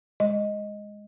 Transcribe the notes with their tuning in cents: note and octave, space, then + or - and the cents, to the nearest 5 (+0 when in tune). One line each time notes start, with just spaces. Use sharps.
G#3 +0 D#5 +0